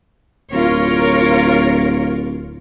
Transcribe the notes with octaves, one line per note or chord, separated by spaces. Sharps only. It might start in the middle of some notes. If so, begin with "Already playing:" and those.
D1 F4 A#4 C#5